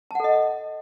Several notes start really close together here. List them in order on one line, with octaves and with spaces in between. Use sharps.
A5 F#5 A4 D#5